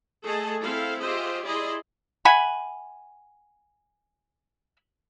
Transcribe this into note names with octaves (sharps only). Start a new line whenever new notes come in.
A3 G#4 A4 D#5 A5
C4 E4 A4 F5
F4 G4 G#4 C5 D#5 E5
E4 G#4 D5 D#5 C6
E5 F#5 G#5 B5